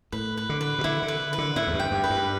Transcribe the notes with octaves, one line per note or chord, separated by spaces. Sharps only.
A2 B4
B4
D3
B4
B2
D3 E4
D3
B4
B4
D3
A2 E4
E2
G2
G5
G2
B4
G2